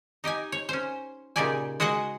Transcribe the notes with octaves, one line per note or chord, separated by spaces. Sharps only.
D#4 G4 D#5 G#5
C#5
C#4 C5
A#2 C#3 D#4 G4 D5 G#5
G#3 F#4 G#4 D#5 F#5